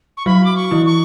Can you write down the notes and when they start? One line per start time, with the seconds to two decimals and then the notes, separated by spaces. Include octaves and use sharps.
0.17 C#6
0.26 F#3 F#4 B5
0.44 D6
0.56 C#6
0.71 E3 E4
0.86 C#6